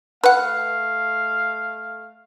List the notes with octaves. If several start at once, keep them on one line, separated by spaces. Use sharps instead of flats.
A3 B4 F5 F#5